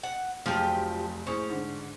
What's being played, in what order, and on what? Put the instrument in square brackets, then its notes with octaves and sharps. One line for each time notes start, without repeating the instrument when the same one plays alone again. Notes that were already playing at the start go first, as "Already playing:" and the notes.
[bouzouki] F#5
[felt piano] F1 F#3 G#4 [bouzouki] F3 G4
[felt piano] A2 G#4 C5 [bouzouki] C#4
[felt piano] G#2 D3